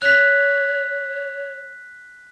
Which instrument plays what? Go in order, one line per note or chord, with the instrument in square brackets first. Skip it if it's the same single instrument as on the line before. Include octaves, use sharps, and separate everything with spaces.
[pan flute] C#5 [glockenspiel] F#6 B6